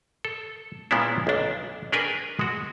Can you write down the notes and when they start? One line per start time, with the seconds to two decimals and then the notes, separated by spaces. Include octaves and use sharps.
0.25 A4
0.91 A#2 G#3 B3 C#4 D4 E4
1.27 B1 D4
1.92 D4 G#4 A#4 B4 G5 G#5
2.39 G#3 F#4